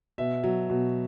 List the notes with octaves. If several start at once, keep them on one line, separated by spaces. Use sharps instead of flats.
B2 E5
F#3
B2